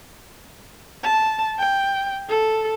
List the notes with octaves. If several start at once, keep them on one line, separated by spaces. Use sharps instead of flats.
A5
G5
A4